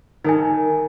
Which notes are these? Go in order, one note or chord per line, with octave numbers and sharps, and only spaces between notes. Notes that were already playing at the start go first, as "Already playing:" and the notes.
D#3 D#4 A#4 G#5